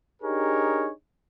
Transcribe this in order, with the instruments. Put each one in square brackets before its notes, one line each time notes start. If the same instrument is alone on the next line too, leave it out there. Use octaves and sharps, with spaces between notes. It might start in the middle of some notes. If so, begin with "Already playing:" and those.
[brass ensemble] D4 D#4 G4 G#4 A#4 C#5